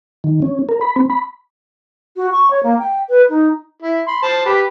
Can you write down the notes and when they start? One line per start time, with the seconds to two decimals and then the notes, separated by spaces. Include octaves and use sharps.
0.24 D#3
0.42 C#4
0.69 A#4
0.81 B5
0.96 C4
1.10 B5
2.16 F#4
2.32 C#6
2.51 C#5
2.63 A#3
2.79 G5
3.10 B4
3.30 D#4
3.82 E4
4.08 B5 C6
4.23 C5 A5
4.45 G4 B4